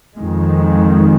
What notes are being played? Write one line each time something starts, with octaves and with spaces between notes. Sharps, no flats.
F2 D#3 G#3